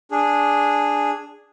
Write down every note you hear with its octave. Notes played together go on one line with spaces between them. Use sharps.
D4 G#4